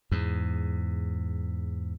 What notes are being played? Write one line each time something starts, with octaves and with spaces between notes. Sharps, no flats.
E2 G#2